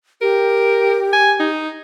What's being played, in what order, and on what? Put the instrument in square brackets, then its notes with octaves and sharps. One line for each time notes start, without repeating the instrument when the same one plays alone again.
[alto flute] G4 [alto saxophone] A#4
[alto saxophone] G#5
D#4